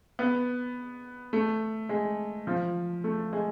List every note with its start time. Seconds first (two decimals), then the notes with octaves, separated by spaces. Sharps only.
0.19 B3
1.33 A3
1.89 G#3
2.47 F3
3.04 A3
3.33 G#3